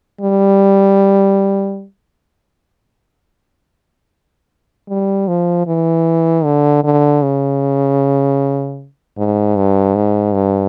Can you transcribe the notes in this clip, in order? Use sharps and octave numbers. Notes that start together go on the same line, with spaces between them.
G3
G3
F3
E3
D3
D3
C#3
G#2
G2
G#2
G2